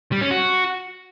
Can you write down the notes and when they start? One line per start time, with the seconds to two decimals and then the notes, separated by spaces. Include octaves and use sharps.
0.12 G3
0.21 C#4
0.31 F#4